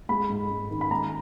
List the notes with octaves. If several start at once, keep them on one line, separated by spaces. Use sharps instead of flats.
G#3 B5
G#2
G#2
D#3
B5
G#3 A#5